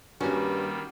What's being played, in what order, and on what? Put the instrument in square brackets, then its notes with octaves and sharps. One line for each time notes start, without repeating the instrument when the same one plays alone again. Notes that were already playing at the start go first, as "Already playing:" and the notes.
[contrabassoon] G2 [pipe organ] D#3 G3 A#3 [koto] C#4 [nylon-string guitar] F#4